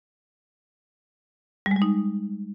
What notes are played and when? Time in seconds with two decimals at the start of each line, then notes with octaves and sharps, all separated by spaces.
1.66 G3
1.71 G#3
1.76 G3
1.82 D#4